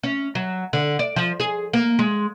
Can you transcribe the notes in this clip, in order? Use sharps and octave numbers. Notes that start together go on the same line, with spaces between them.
C#4
F#3
D3
D5
F3
G#4
A#3
G#3